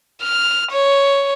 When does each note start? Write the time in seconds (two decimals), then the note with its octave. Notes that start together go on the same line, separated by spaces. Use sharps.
0.23 F6
0.71 C#5